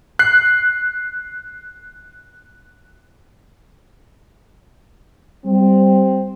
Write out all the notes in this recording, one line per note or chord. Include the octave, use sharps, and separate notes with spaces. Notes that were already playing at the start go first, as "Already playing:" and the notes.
F#6 C7
G3 C4